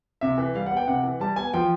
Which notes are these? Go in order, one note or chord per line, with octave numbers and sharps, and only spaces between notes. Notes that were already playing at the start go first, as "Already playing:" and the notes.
C3 E5
E3
G3 F5
F#5
B3
G5
C3 F#5
E3
G3 A5
B3 G#5
F3 G5